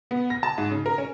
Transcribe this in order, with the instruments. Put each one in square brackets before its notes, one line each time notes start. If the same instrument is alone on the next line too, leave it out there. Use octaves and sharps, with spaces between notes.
[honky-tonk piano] B3
A#6
A5
G#2
C#3
A#4
C#4